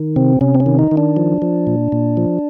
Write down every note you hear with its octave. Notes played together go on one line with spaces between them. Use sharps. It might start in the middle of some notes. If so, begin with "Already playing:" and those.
Already playing: D#3
C3 C4
C3 C#4
C4
C#4
D#3
D#4
D#3
D4
F3
F3
A#2
A#2
F3